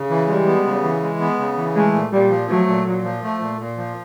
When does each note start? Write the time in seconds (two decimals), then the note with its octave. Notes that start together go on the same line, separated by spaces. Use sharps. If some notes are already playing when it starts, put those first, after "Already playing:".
Already playing: C#3
0.10 E3
0.28 G3 G#3
0.46 B3
0.65 C#3
0.83 E3
1.02 G#3
1.20 B3
1.39 C#3
1.57 E3
1.75 G#3 A3
1.94 A#2
2.12 A#2 G3
2.30 F3
2.48 F#3 A3
2.67 A#2
2.85 A#2
3.04 F3
3.23 A3
3.41 A#2
3.59 A#2
3.77 F3